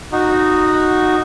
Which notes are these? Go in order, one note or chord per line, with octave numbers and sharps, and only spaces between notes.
D#4 F#4